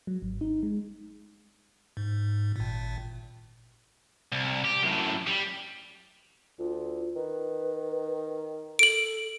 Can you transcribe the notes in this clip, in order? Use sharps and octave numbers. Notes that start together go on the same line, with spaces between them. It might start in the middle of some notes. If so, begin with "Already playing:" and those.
F#3
G#1
D#4
G#3
G#2
G#1 A#2
C2
G4
F#2 A2
G3
D2 F4
D#3 B4
A4 D7 F#7